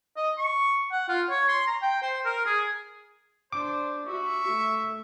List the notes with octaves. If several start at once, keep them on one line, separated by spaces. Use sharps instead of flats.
D#5
C#6
F#5
F4
C#5
C6
A#5
G5
C5
A#4
G#4
D4 C5 D6
F#4 E5 C#6
A3